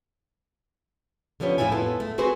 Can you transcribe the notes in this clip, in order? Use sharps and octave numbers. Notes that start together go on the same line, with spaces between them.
D3 F3 B3 C#4 G4
F2 A2 D#3 E4 F4 G#5
B3 F4 A4
A3
B3 C4 F#4 G#4 B4 C5